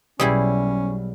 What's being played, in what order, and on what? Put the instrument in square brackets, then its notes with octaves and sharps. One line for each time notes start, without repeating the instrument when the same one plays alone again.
[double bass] B1 [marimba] B2 [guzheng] G3 E4 G#4 [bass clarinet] C#4